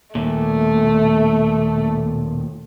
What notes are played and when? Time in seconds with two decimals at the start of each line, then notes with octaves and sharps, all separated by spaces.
0.15 D#2 A#2 A3